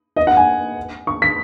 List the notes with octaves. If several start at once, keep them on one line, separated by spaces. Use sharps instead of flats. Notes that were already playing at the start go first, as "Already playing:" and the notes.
D#5
F#5
G#5
C#6
B6